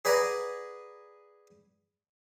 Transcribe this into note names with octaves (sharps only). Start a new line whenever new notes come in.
G#4 B4 D5 F#5 G#5 A#5